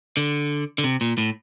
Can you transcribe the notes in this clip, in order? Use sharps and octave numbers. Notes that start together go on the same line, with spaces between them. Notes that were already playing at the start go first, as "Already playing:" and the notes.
D3
D3
C3
A#2
A2